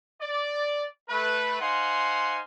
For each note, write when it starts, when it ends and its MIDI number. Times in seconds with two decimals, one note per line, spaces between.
0.21 0.84 74
1.09 1.59 57
1.09 1.59 71
1.60 2.40 63
1.60 2.40 72
1.60 2.40 77
1.60 2.40 78
1.60 2.40 80
1.60 2.40 84